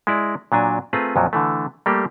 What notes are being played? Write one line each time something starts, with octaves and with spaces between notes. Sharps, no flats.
G#3 E4 D5
A#2 F#3 D4 G#5
A3 C4 F4 G#4 B4 A#5
F2 A#2 F3 F#3
D3 E3 A3
G3 A3 A#3 G4